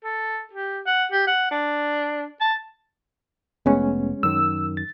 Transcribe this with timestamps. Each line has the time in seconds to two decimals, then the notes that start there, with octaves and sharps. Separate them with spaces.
0.04 A4
0.53 G4
0.86 F#5
1.12 G4
1.27 F#5
1.51 D4
2.41 A5
3.66 F1 G#3 A3 B3 C#4
4.23 F#2 D#3 E6
4.77 A6